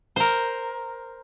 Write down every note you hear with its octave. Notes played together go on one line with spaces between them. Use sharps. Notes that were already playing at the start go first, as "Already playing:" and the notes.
A#4 C5